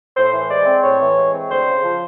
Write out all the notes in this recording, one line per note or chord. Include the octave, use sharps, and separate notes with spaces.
A2 C5
E3
G#3 D5
C4
A2 C#5
E3
G#3
C4
D2 C5
C#3
F3